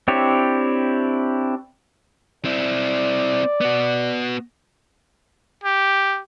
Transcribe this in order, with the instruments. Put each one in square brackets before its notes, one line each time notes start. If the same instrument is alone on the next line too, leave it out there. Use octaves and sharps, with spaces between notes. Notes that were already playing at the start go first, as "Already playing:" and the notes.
[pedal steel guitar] C4 D4 E4 G4 C#5
[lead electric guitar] C4 E4 [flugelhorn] D5
[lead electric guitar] B3 F#4
[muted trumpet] G4